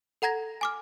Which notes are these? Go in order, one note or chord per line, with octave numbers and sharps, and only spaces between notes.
A4 F#5 A#5 G#6 A#6
G#5 D6 F6